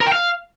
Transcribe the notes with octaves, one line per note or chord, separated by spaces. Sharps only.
A#4
G5
F5